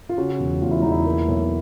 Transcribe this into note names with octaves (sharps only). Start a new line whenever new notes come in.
F4
C#3 F#4
E1
E2 F4
E4
E2 D#4
E4
A#3
B1